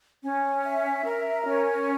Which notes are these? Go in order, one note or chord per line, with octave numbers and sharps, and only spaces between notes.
C#4
E5
A#4
C#4